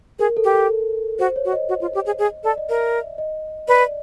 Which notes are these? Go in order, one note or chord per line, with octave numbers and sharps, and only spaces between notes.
G#4 A#4
A4
G4
A4
F#4 C5
C#5
F#4
D#5
F#4
F4
G4
G#4
G#4
A4 D5
D#5
A#4 E5
D#5
B4 D5